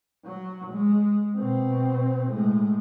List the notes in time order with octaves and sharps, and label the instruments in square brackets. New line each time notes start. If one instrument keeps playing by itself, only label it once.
[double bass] F#3
G#3
B2 C4
A2 G#3